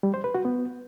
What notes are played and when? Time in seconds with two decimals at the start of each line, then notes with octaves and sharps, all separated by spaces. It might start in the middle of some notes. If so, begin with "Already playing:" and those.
0.03 G3
0.14 C5
0.24 B4
0.34 F#4
0.45 B3